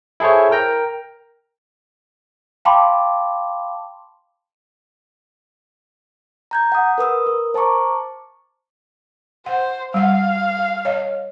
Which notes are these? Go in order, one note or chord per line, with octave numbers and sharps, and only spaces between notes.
E4 G#4 A4 C5 C#5
A#4 G5 A#5
F5 G5 A5 B5 C6 D6
A#5 G6 G#6
F#5 D#6
A#4 B4 D#6 E6
A#4
C5 A5 A#5 C#6 D6
C5 F#5
G3 F5 F#5
C#5 D#5